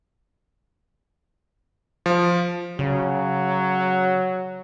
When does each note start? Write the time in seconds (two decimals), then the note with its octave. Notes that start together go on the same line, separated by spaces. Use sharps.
2.06 F3
2.79 C#3 F#3